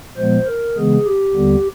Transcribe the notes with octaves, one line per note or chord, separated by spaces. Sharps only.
A#2 F3 G#3 B3 C5
A#4
C#3 E3 G#3 B3 G#4
G4
D#2 D3 G3 B3